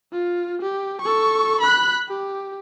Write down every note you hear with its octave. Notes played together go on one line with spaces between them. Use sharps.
F4
G4
A4 C#6
B5 F#6
G4